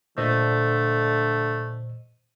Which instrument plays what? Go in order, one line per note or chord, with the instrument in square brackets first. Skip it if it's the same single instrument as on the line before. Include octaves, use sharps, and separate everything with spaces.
[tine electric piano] A#2 C5 D#5 [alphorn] D3 [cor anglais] A3